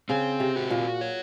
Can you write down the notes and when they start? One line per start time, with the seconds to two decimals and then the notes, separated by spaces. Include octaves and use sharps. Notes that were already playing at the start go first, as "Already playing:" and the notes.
0.09 C#3 C4
0.40 C3
0.56 F#4
0.70 A#2
1.01 C#5